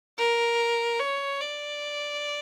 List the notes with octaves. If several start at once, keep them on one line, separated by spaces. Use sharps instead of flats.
A#4
C#5
D5